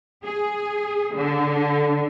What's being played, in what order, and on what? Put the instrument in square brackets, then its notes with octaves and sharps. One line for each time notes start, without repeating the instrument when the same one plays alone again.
[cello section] G#4
D3